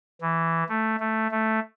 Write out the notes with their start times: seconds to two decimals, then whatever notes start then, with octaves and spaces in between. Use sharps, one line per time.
0.21 E3
0.69 A3
1.00 A3
1.31 A3